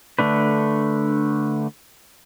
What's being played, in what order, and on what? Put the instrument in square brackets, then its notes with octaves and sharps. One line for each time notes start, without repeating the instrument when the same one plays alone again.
[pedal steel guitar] D3 A3 D4 B4